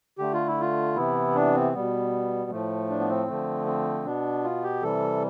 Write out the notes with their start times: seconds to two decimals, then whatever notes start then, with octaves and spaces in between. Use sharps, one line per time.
0.19 D3 A3 G4
0.33 F4
0.47 E4
0.60 F4
0.96 C3 E3 B3 E4
1.35 D4
1.54 C4
1.73 B2 G3 B3
2.51 A2 F3 A3
2.90 D4
3.00 B3
3.09 C4
3.28 D3 F3 A3
3.67 C4
4.05 B2 B3 D4
4.44 F4
4.63 G4
4.82 C3 E3 G3 A4